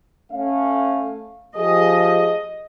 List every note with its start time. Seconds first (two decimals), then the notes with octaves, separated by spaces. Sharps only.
0.32 A3 C#4 F5
1.56 F3 G4 G#4 D#5